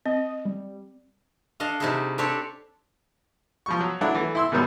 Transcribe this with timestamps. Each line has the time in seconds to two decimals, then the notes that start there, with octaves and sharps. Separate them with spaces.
0.06 C4 D#5
0.45 G3
1.60 D4 A4 D#5 F5
1.80 C3 G3 D#4 E4 F#4 G#4
2.18 C4 D4 G4 A4 C#5 D5
3.66 F3 G3 C#6
3.81 F#3
4.01 F#3 A3 D4 E4 F#5
4.15 E3 A3
4.35 E4 C6 E6
4.52 G#2 B2 D#3 F#3 G3